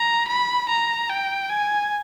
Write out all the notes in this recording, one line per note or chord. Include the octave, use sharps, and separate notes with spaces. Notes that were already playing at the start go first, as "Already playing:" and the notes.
Already playing: A#5
B5
A#5
G5
G#5